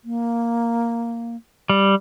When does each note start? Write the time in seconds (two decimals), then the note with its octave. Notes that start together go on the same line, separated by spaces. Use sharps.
0.05 A#3
1.69 G3